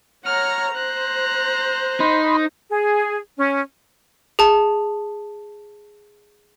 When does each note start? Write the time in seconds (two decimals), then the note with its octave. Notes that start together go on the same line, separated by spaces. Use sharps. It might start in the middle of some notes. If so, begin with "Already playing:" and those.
0.24 C#5 F#5 A#5 F6
0.75 C5 A#5 F#6
2.00 D#4 B5 C6
2.70 G#4
3.37 C#4
4.39 G#4 A5